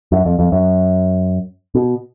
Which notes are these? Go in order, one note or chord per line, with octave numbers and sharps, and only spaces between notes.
F#2
F2
F2
F#2
B2